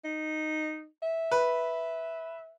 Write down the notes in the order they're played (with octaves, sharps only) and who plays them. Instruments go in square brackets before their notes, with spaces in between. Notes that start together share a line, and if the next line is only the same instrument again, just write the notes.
[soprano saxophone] D#4
E5
[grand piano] B4